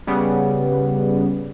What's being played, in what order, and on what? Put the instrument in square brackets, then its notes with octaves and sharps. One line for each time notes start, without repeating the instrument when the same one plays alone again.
[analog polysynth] C#3 G3 B3